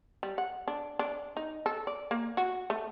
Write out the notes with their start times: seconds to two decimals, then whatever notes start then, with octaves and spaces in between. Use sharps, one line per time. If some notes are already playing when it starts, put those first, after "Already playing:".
0.23 G3
0.38 F#5
0.68 D4
0.99 D4
1.37 D#4
1.66 A4
1.87 D5
2.11 A#3
2.37 F#4
2.70 A3